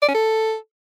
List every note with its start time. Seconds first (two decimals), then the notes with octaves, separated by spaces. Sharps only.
0.02 D5
0.08 C#4
0.15 A4